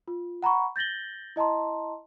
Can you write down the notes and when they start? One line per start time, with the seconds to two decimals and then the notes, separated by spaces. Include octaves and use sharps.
0.08 F4
0.42 F#5 A#5 B5 C#6
0.76 G6 A6 A#6 F#7 G7
1.36 E4 D#5 A5 A#5 C6